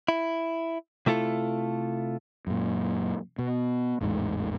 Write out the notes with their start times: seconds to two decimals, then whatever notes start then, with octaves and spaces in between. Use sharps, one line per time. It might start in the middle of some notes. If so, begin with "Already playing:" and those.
0.08 E4
1.06 C3 A3 E4 F4 A4
2.47 F#2 A#2
3.39 B2
4.01 A1 E2 G#2 G#3